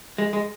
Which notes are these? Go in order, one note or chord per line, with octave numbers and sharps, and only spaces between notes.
G#3
G#3